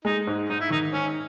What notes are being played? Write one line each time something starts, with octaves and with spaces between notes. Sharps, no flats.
G#3 D#4
G#2
G#2 D#4
E4
D#3 D#4
G#2 C#4